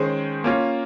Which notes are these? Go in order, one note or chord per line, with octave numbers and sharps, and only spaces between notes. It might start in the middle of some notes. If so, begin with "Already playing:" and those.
Already playing: D#3 G#3 C#4 G#4 C5
A#3 C#4 F4